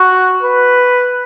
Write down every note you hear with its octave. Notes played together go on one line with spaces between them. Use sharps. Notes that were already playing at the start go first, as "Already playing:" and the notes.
Already playing: F#4
B4